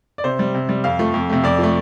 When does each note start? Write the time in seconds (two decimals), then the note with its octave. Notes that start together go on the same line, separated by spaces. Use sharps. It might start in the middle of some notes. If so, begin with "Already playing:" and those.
0.18 D5
0.24 C3 C5
0.39 G3
0.55 C3
0.69 G3
0.84 F2 F5
0.99 F3 A3
1.14 F2
1.29 C3 A3
1.43 F2 D5
1.59 F3 A3